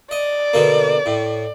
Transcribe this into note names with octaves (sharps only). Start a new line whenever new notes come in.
D5 D#5
B2 D3 A#3
A2